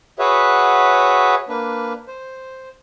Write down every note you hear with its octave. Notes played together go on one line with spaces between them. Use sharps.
F#4 G#4 B4 C#5 E5 F#5
A#3 D4 B4
C5